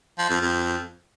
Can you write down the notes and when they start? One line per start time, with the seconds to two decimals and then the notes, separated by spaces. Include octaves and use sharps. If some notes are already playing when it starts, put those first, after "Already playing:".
0.18 F3
0.30 F2
0.41 F2